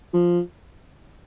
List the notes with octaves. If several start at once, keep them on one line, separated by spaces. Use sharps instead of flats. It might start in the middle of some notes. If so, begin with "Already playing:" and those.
F3